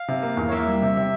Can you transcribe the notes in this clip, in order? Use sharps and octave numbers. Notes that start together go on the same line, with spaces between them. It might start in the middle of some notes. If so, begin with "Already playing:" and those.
Already playing: F5
C3
A#3
E2
C#5
A#3 E5
G3
C3
C3